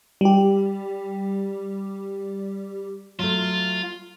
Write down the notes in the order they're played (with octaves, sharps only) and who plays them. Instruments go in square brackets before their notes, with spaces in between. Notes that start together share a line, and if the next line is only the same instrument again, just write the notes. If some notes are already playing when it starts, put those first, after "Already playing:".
[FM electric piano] G3 G4
[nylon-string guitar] F#3 A3 [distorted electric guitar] F4